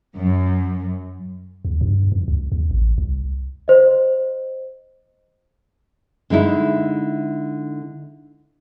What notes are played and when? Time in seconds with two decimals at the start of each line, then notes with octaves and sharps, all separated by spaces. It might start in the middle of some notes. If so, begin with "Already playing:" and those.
0.17 F#2
1.65 D#2
1.81 G2
2.12 F2
2.28 C#2
2.52 D#2
2.71 A1
2.98 C2
3.68 C5 D#5
6.30 D3 G#3 D#4 E4